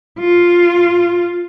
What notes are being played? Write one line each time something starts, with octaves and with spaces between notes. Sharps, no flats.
F4